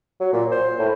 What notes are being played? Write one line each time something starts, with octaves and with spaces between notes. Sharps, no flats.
F#3
A#2
C5
A2